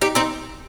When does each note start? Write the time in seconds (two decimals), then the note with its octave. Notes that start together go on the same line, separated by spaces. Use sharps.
0.01 D#4 G4
0.15 C4 D#4